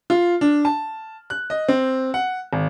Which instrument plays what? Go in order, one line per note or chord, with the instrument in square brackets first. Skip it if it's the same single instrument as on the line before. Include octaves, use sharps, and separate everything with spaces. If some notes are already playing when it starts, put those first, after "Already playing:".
[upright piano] F4
D4
A5
F#6
D#5
C4
F#5
G#1